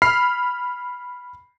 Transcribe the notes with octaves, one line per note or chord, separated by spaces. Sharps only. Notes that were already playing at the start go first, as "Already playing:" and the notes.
B5 F6 C7